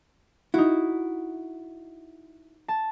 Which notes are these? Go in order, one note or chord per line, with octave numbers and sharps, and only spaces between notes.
D#4 E4 F#4
A5